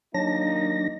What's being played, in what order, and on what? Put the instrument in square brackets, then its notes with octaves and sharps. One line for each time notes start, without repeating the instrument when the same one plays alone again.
[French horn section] D#2 A#3 D#4 [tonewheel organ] F#3 D4 A#6